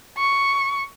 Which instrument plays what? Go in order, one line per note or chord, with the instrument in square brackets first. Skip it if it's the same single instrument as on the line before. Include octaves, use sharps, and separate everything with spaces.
[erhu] C#6